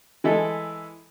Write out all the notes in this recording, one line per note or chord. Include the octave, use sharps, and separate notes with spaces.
E3 G#3 E4 A4